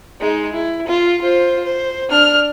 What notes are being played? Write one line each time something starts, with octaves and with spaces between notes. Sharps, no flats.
G#3 D#4
E4
F4
F4 C5
C5
D4 F6